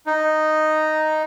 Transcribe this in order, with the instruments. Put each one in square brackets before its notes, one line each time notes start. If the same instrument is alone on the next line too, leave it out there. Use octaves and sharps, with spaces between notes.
[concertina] D#4